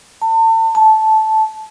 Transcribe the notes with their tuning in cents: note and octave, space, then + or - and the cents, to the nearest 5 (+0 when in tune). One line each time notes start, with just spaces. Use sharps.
A5 +35
A5 -10